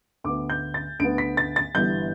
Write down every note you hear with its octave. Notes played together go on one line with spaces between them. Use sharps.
D2 D3 B3 D6
G6
A6
D2 D3 B3 D7
B6
A6
A6
G1 G2 E3 B3 G6